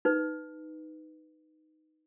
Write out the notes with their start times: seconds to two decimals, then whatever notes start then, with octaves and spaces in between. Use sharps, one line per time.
0.05 D#4 B4